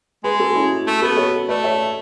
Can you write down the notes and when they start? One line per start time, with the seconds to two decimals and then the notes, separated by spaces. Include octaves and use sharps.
0.24 G#3 G#4 B4
0.39 F#4 A4
0.55 C#4 E4
0.87 A3
1.02 B3 F#4 A4
1.17 A4 C#5
1.48 A3 B4 D5
1.64 C#5 E5